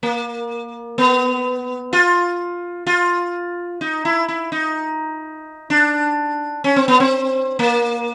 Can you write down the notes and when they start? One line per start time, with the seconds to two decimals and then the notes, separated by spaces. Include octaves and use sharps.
0.03 A#3
0.98 B3
1.93 F4
2.87 F4
3.81 D#4
4.05 E4
4.28 E4
4.52 D#4
5.70 D4
6.64 C#4
6.76 C4
6.88 B3
7.00 C4
7.59 A#3